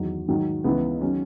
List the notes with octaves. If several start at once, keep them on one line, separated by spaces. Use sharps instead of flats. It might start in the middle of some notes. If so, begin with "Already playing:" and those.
Already playing: E2 D#3 F#3
G#2 D#3 F#3
C#2 C#3 E3 B3
D#3 F#3 C#4